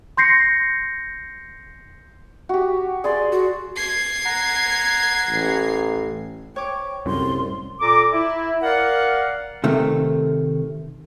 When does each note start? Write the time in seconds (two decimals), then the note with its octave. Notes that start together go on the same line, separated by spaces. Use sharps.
0.17 C6 G6 A#6 C7 C#7
2.49 F#4 G4
3.04 G#4 D5 C6
3.32 F#4
3.76 G#6 C7
4.25 F#5 A#5
5.30 A1
6.56 C#5 G5 D6
7.06 C2 F#2 A2 C6
7.81 A#2 A4 A#5 D6
8.14 E4 E5
8.63 A#4 D5 F5 F#5
9.64 C3 D#3 A3